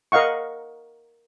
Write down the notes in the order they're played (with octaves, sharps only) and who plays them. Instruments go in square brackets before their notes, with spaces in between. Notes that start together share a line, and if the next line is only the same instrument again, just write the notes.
[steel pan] A#4 D#5 F5 F#5 C#6